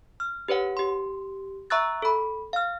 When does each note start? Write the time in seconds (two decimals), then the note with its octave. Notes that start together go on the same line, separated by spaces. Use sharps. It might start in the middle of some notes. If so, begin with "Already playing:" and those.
0.20 F6
0.48 G4 B4 C#5 F#5
0.77 G4 C6
1.70 E5 A#5 C#6 E6 F#6 A6
2.02 A4 B5
2.53 F5 F6